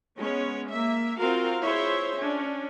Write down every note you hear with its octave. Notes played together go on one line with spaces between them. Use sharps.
G#3 B3 C#4 C#5
A#3 E5
C4 F4 F#4 A#4 F5
E4 F4 G#4 C5 C#5 E5
C#4 D4